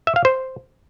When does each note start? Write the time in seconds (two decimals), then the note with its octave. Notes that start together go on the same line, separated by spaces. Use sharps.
0.07 E5
0.16 F5
0.25 C5